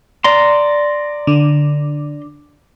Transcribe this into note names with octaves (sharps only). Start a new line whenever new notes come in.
D5 A#5 C6
D3